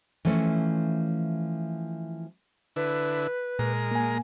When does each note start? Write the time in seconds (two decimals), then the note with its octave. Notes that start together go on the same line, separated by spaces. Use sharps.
0.25 E3 F3 A3 C#4
2.76 D3 E4 B4
3.59 A#2 G#3 A#4
3.91 A#3 G#5